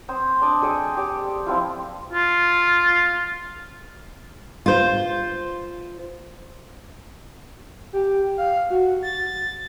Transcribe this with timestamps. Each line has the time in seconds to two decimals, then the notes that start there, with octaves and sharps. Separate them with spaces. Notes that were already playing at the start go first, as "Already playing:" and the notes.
0.08 C4 C5 D#6
0.42 D4 D5 D#5
0.62 G#4 A4 D#5 G5
0.97 G4 D5
1.47 F3 C4 E4 F4
2.13 F4
4.66 F4 C5
7.93 G4
8.38 F5
8.70 F#4
9.03 A6